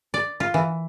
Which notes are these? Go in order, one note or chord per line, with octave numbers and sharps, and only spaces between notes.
D5
F4
E3